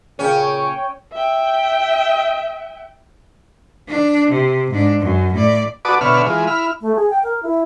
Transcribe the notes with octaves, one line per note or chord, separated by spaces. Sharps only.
A#2 C#3 C#4 C#5 G5
E5 G5
D4
C3
G#2 D4
F#2
A2 D5
F#4 B4 D5 A5 D6 D#6
B2 D3 B4 C#5 E5 F6
E3 G#3 F4
E4 B5 F6
A3
G#4
G5
A#4
E4